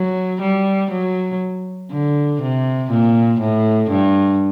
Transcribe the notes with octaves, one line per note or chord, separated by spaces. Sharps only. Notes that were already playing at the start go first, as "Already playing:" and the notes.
Already playing: F#3
G3
F#3
D3
C3
A#2
A2
G2